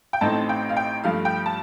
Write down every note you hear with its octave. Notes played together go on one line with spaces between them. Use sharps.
G5
A1 A2 A3 C4 D#4 A5
G5
F5
G5
G2 F3 A3 F5
G5
A5